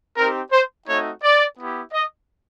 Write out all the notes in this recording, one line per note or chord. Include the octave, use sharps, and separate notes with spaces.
C4 D#4 G4 A#4
C5
A3 C4 D#4 F#4 C#5
D5
B3 E4 G4
D#5